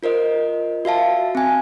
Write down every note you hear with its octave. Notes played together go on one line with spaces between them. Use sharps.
F4 A#4 C5 D#5
F#4 E5 F5 A5
C4 G#5